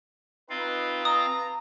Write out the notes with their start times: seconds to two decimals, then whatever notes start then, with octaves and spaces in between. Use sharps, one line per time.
0.50 C4 D#4 F4 B4 F5
1.05 B4 A5 A#5 D#6